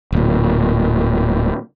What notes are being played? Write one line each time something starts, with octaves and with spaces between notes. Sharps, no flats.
D1 A#2